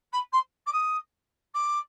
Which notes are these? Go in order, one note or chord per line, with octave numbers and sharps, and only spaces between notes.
B5
C6
D6
D#6
D6